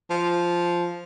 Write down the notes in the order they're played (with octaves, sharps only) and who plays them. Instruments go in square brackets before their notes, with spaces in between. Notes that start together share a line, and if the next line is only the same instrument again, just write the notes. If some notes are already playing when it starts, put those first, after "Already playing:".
[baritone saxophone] F3